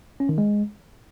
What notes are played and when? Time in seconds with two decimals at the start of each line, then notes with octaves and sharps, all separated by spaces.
0.20 C#4
0.29 D#3
0.38 G#3